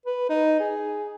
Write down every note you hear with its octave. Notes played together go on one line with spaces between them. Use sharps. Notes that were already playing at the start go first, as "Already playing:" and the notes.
B4
D#4
G#4